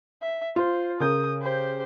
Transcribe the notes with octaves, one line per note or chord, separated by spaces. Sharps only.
E5
F4 C5
C#3 A#4 D#6 G6
G4 C5